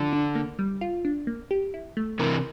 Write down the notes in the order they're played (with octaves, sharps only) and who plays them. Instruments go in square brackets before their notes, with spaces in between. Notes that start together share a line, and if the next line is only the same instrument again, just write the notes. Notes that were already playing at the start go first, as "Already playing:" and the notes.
Already playing: [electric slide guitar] D3 [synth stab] F3
[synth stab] D4
A#3
G3
F4
D4
A#3
G4
E4
A3
[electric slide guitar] C3 E3 [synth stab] A#4